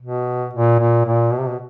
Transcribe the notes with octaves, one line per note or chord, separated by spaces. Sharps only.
B2
A#2
A#2
A#2
B2
C3
B2